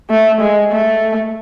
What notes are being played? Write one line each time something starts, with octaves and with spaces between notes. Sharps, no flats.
A3
G#3
A3